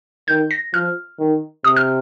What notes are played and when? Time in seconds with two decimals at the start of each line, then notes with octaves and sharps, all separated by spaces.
0.28 D#3 G6
0.51 A#6
0.74 F3 F6
1.19 D#3
1.64 C3 D#6
1.76 F6